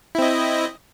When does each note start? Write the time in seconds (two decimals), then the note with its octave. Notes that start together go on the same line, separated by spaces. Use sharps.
0.15 E4
0.19 C4
0.22 D#5